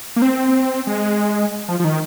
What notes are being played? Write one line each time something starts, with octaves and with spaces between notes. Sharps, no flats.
A#3
C4
G#3
F3
F3
D#3